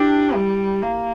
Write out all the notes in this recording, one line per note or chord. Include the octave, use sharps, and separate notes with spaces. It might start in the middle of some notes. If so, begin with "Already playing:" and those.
Already playing: D4 E4 G4
G3
A#3